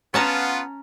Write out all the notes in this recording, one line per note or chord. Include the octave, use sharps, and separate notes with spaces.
B3 C#4 F4 A5 A#5